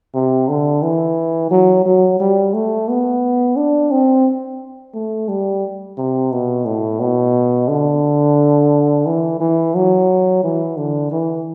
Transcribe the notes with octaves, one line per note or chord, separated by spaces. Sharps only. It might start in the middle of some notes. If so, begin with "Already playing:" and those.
C3
D3
E3
F#3
F#3
G3
A3
B3
D4
C4
A3
G3
C3
B2
A2
B2
D3
E3
E3
F#3
E3
D3
E3